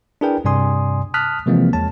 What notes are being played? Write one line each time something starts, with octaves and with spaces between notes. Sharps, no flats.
D4 E4 G#4 A#4 B4 G5
G2 C3 D5 G#5 C6 D#6
A5 D#6 F6 F#6 B6
C3 E3 F3 G#3 A#3 C4
E2 G#3 C#5 A5